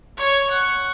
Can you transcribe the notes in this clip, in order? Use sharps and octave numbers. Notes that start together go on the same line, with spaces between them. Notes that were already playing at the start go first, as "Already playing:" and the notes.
C#5
F#5 C#6